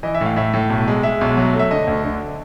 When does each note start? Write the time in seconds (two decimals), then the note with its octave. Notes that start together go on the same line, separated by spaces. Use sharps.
0.03 E3 D#5
0.15 E5
0.21 A2 F5
0.36 A2 E5
0.53 A2
0.70 B1
0.88 G#3
1.03 G#3 E5
1.21 B1
1.37 F#3
1.53 A3
1.59 E5
1.71 D3 D#5
1.87 D2
2.04 D3